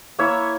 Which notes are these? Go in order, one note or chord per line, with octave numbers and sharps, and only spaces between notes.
A#3 E4 C#5 E5